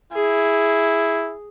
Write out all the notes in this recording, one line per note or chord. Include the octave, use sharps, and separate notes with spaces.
E4 G#4